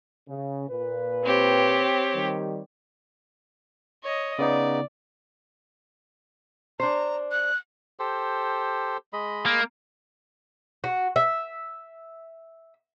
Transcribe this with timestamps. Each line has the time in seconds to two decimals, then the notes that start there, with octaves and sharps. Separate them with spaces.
0.29 C#3
0.69 A#2 B4
1.23 C4 G4 C#5
2.14 D#3 G3
4.03 C#5 D#5
4.39 C#3 B3 D#4 D5
6.80 D4 C5 A#5
7.31 F#6
7.99 G4 A4 C5
9.13 G#3 D#5 B5
9.46 A#3
10.84 F#4
11.16 E5